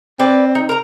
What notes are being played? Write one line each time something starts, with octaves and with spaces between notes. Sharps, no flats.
C4 B4 D5
D#4
A#4 A#5